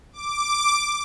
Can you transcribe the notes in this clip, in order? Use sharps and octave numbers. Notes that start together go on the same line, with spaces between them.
D6